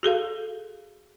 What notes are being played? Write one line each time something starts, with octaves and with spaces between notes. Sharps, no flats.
F#4 G#4 A4 F5